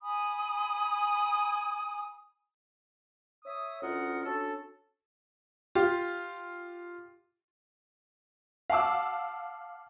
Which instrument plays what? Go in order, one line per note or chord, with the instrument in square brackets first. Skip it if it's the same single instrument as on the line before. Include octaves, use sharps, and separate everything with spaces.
[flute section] G#5 B5 D#6
[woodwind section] C#5 E5 D#6
D2 C#4 F4 A#4 D#5 F#5
C#4 D4 F#4 A4
[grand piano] F4 G4
[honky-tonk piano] F5 F#5 A5 D6 E6